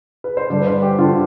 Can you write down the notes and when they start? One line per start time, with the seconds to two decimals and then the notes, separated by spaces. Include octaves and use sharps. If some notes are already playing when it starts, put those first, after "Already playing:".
0.24 B4
0.37 C5
0.50 G2 D3 D5
0.62 B4
0.67 C5
0.82 G4
0.98 D3 F4